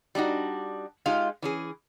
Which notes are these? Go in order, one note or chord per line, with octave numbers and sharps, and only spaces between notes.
G3 D4 D#4 F#4
G#3 D#4 F4 G4 F5
E3 C#4 G#4